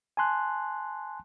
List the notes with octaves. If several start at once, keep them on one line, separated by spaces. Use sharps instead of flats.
G#5 A5 C6 F#6